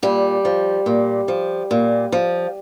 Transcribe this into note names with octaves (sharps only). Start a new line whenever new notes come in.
A#2 G3
F3
A#2
F3
A#2
F3